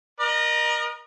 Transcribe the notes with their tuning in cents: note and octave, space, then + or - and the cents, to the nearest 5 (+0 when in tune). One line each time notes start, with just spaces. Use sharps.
A#4 +25 D#5 -35